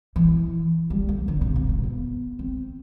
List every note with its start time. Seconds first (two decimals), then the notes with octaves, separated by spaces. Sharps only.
0.16 E3
0.90 G3
1.09 A3
1.28 D3
1.41 C3
1.56 C3
1.69 C3
1.83 B3
2.39 C4